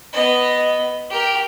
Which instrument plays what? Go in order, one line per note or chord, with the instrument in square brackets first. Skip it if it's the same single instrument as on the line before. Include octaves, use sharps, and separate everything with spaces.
[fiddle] B3 D#5
G4 A#4